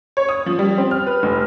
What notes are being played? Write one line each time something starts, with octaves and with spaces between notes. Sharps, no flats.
C#5
D#6
F3
G3
C4
F6
B4
F1